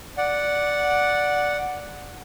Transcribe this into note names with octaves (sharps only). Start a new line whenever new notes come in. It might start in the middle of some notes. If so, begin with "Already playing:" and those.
D5 F#5